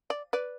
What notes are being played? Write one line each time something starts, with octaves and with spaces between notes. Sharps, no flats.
D5
B4 D5